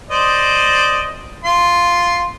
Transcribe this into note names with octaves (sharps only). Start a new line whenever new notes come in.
C5 D5 D#5
F4 C6